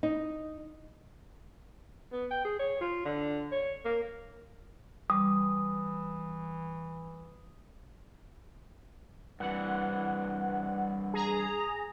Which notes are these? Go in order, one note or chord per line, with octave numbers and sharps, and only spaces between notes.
D#4
B3
G5
G#4
C#5
F4
D3
C#5
A#3
E3 G3 D6 D#6
G2 E3 F#5
G#4 A#5